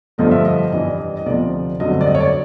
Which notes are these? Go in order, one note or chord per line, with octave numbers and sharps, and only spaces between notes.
G2 D3 F3 A3 D#5
E5
D#5
G2 E3 G3 D#5
D5
D#5
D#5
D2 C3 F3 D5
G2 D3 F#3 A3 C4 D#5
D5
D#5
C#5
D5